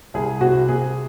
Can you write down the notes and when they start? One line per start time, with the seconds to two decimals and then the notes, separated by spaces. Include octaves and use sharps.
0.14 C2 G#4
0.41 C3 F#4
0.69 C3 G#4